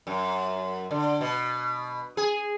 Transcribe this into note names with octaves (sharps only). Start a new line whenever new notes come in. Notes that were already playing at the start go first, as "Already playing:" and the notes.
F#2
D3
B2
G#4